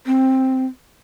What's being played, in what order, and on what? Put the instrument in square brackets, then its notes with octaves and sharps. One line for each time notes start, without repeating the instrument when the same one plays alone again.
[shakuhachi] C4